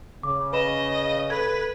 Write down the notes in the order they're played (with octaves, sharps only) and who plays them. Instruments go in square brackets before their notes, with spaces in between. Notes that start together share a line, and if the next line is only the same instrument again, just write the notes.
[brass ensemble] C#3 [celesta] D6
[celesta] B4 B5 E7 [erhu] D#5
[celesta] A4 G#6 [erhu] B4